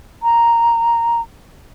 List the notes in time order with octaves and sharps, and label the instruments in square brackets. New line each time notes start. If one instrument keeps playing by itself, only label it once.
[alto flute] A#5